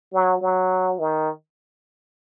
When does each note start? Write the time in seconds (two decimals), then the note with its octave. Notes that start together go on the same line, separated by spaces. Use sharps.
0.13 F#3
0.41 F#3
0.99 D#3